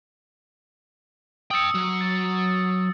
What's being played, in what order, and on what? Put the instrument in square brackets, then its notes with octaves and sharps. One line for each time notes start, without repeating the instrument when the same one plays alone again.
[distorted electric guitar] G5 A5 [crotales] D#6 E6 C#7
[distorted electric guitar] F#3
[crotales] A6